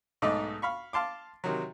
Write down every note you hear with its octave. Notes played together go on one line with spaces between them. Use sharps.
B1 G#2 A3 D#4 D#5 D6
F5 B5 C#6
F5 A5 C6 D6
C3 D#3 F#3